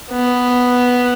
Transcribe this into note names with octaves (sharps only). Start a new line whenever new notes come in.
B3